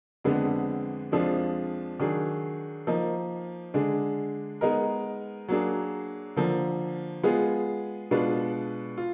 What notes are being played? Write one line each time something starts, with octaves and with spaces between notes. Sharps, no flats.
F2 D3 G#3 B3 D4
F2 F3 G#3 D4 F4
D#3 F#3 D4 G#4
F3 A#3 D#4
D3 G#3 D4 G#4
G#3 B3 D#4 A#4
F#3 A#3 D4 G#4
D3 F3 A#3
G#3 B3 F4 G#4
B2 G#3 D4 F4 B4
F4